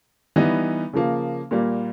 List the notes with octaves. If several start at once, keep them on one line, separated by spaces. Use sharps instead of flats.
E3 G3 B3 D#4
C#3 F3 A#3
A#2 G3 A#3